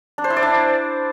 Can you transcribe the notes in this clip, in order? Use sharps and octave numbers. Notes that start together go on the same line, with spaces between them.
D4
C5
E4
D5
D4